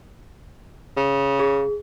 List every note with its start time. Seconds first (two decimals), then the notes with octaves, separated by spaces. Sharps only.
0.97 C#3
1.39 G#4